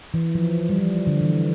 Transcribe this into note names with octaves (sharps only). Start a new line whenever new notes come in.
E3
F3
G3
F3
D3
E3